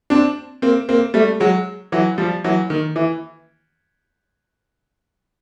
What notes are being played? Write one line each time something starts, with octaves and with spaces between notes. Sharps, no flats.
C4 D4
A#3 C4
A#3 C4
G3 A3
F#3 G#3
E3 F#3
F3 G3
E3 F#3
D#3
E3